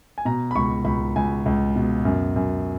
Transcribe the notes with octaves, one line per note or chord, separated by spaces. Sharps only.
G#5
B2 A#5
B5
C#2 C#6
C#2 B5
C#2 G#5
C#2
B2
F#2
F#2